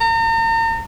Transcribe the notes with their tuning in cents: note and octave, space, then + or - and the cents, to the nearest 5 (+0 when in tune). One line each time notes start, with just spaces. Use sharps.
A#5 -40